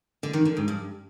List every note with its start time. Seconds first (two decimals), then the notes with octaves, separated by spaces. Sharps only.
0.23 D3
0.33 D#3
0.45 D3
0.57 G#2
0.68 G2